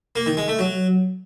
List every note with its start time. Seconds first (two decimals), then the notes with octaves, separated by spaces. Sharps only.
0.16 A#3
0.26 D#3
0.37 G#3
0.48 A3
0.59 F#3